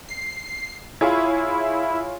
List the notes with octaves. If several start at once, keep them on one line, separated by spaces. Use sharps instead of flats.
C7
E4 F4 G#4 C#5